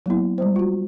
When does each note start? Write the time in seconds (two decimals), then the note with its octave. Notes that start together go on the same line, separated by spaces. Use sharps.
0.06 F#3 A#3 B3 E4
0.38 G3 G#3 C5
0.56 F4 F#4